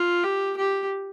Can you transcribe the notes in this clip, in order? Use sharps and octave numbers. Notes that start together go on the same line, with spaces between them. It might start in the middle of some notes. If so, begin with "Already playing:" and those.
Already playing: F4
G4
G4